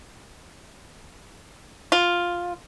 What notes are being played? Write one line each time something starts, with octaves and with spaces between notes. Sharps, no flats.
F4